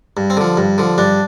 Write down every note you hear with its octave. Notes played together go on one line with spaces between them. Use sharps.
G2
C4
D3 F3
G2
D3 F3
G2 D4